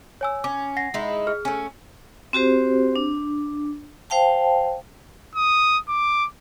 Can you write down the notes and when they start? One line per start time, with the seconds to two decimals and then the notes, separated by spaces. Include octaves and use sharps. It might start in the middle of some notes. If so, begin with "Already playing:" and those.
0.21 C#5 G#5 E6
0.44 C#4 D6
0.77 F#5 A#6 C7
0.94 G#3 D#4 E4
1.27 G#4 F6
1.45 A3 C#4
2.33 C4 F#4 G4 C5
2.96 D4
4.10 C5 F5 G5 A5
5.36 D#6
5.89 D6